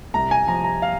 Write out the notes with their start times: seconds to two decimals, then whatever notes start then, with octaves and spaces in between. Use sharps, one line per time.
0.14 C2 A#5
0.31 G#5
0.48 F3 A#5
0.64 A#5
0.82 F5